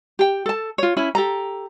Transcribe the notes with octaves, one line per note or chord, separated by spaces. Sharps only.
G4 G5
A4 A5
F4 C#5
C#4 E4 B5
G4 A4 A#5